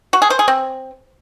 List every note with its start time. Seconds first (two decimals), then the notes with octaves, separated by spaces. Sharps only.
0.13 F#4
0.22 G#4
0.30 C5
0.39 G#4
0.48 C4